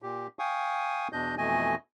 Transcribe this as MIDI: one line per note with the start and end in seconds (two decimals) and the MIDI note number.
0.02 0.27 46
0.02 0.27 67
0.39 1.08 77
0.39 1.08 79
0.39 1.08 80
0.39 1.08 85
0.39 1.08 87
1.13 1.35 40
1.13 1.35 47
1.13 1.35 62
1.13 1.35 75
1.13 1.35 91
1.38 1.75 41
1.38 1.75 47
1.38 1.75 52
1.38 1.75 57
1.38 1.75 75
1.38 1.75 80